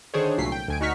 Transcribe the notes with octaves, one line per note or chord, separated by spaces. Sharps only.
D3 D#3 D4 G#4 C5 C#5
C2 A#2 F#3 A3 B6 C7
G5
D2 G#5 D7
D2 D#4 F#4 C#6 F6 B6